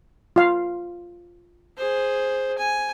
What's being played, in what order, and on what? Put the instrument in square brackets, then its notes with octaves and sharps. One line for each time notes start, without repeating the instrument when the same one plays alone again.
[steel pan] F4 F5
[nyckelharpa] G#4 C5
G#5